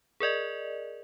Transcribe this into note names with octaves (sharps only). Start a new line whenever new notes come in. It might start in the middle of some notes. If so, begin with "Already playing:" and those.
G#4 A#4 D5 D#5